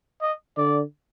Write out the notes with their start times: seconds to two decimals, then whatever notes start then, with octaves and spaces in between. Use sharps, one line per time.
0.21 D#5
0.57 D3 D5